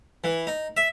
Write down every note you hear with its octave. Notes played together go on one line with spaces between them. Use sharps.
E3
D#4
E5